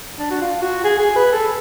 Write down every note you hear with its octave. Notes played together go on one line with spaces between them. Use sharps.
D4
F#4
F4
F#4
G#4
G#4
B4
A4